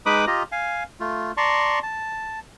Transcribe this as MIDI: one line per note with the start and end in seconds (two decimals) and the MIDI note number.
0.06 0.25 56
0.06 0.25 63
0.06 0.25 71
0.06 0.25 83
0.06 0.25 86
0.06 0.25 87
0.27 0.43 65
0.27 0.43 67
0.27 0.43 75
0.27 0.43 82
0.52 0.83 77
0.52 0.83 80
1.00 1.32 57
1.00 1.32 65
1.37 1.79 74
1.37 1.79 81
1.37 1.79 82
1.37 1.79 84
1.37 1.79 85
1.83 2.39 81